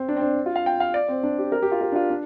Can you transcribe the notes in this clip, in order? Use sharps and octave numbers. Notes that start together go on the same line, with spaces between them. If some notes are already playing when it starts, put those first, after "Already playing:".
Already playing: C4
D4
C4
D4
F4
F5
G5
F5
D5
C4
D4
G4
A#4
G4
F4
A#4
D4
F4
D4